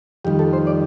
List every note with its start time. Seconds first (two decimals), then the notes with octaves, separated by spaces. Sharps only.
0.25 F2 D#3 G3 G4
0.39 A4
0.53 C5
0.67 D5